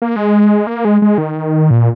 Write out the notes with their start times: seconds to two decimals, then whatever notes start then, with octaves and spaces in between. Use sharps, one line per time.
0.02 A#3
0.16 G#3
0.67 A#3
0.85 G#3
1.02 G#3
1.18 D#3
1.71 A#2